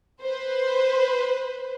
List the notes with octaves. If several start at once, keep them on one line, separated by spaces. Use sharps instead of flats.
B4 C5